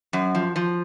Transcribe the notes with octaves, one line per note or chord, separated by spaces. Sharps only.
F#2
F3
F3